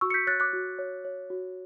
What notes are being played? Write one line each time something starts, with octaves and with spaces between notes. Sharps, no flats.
F#4 C#6 E6
C#7
G6 B6
C#5 F#6 A6
D6 F#6
F#4
C#5
C#5
F#4